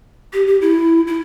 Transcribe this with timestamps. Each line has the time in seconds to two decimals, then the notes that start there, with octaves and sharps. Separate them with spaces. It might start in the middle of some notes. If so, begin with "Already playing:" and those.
0.33 G4
0.47 G4
0.61 E4
1.07 E4